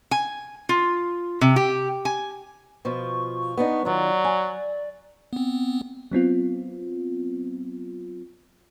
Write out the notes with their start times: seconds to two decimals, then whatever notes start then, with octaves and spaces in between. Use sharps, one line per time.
0.11 G#5
0.69 F4
1.41 C3
1.56 G4
2.05 G#5
2.85 B2 F3 F4 C#6
3.58 B3 D4 D#4
3.85 D#3 F#3 F4 D5
4.25 G#5
5.33 B3 C4
6.11 F#3 B3 C4 F4